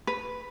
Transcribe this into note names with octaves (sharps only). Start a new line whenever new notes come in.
B4